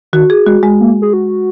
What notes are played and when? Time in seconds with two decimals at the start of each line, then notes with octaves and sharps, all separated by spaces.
0.13 D#3 F#4
0.30 G#4
0.46 G#3 F#4
0.63 G#3
0.81 A#3
1.02 G#4
1.13 F#4